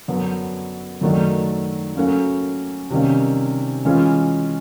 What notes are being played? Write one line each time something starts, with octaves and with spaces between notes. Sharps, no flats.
F#2 D3 F#3 B3
F#2 D#3 F#3 A3 D4
F#3 A#3 C#4 F#4 A4
C3 D#3 G3 A#3 C#4
E3 G#3 C#4 F4 G#4